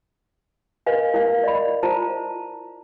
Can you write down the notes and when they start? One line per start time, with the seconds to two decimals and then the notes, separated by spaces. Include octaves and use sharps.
0.86 A#4 B4 D#5 F5 G#5
1.14 E4 A#4 F5
1.44 D5 D#5 B5
1.83 E4 F4 C5 A5 A#5